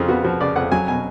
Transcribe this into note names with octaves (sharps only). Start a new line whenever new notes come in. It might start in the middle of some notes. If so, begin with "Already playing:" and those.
Already playing: F2 C#3 F4
B3 F#4
F3 F#4
C#3 D5
F2 F#5
F#3 G#5
B2 G#5